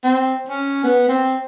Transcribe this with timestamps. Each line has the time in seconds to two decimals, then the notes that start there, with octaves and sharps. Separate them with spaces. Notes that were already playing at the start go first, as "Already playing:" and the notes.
0.04 C4
0.49 C#4
0.84 B3
1.08 C4